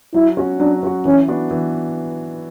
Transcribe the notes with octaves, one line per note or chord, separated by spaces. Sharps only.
F#3 E4
C#4 F#4
F#3 D4
C#4 F#4
E3 C#4
B3 D4 F#4
E3